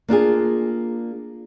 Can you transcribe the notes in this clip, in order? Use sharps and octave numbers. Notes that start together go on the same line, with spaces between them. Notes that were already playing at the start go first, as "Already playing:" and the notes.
A#3 D4 F4 G#4